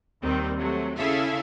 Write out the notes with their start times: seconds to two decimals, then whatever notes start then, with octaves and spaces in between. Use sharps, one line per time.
0.23 D#2 D#3 G3 C4
0.58 C3 F#3 A3
0.98 C#3 E4 G#4 A4 E5 F5